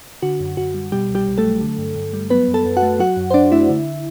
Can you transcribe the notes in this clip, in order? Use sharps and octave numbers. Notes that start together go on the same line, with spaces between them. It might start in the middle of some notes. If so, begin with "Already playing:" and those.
D3 F#4
F#2
F#2 F#4
G3
B2 G3 G4
C2
G3 G4
C2
A3 A4
F#3
D3
G2
G2
G3
F#3 B3 B4
F#2
A4 A5
F#2
F#4 F#5
A3
F#3 F#4 F#5
F#2
C5
F#2 D4 D5
A3 E4 E5
D3